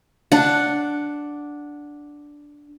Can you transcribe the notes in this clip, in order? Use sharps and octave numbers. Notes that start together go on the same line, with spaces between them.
D4 F#5